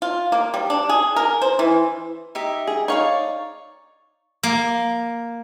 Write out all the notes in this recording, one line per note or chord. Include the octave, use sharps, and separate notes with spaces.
F4
A#3
G3
D4
G#4
A#4
C5
E3
D#4 G4 E5
G#4
D#4 C#5 D5 F5 C#6
A#3